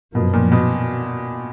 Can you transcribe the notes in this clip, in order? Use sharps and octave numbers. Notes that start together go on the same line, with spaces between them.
F#2 B2 F3 A#3
A#2
B2